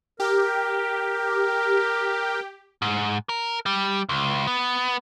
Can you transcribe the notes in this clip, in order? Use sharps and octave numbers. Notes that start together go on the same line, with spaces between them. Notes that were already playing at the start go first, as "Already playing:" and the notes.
G4 A#4
G#2
A#4
G3
C#2
B3